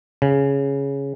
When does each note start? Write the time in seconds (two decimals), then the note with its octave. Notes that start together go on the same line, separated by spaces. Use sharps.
0.22 C#3